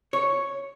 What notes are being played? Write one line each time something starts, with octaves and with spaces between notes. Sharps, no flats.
C#5